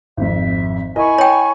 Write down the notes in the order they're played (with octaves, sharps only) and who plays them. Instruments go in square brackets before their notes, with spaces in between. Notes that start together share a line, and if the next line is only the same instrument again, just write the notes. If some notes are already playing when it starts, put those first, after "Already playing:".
[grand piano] G#1 F2 [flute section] E5
[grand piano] E4 A#4 D#5 [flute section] G#5 B5 C#6
[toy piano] C#5 G5